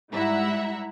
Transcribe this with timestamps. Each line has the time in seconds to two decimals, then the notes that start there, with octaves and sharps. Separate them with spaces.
0.11 G#2 G3 E4 E5 F#5 A#5